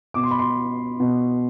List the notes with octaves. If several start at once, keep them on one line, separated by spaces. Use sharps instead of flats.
B2 D6
C6
B5
C6
B2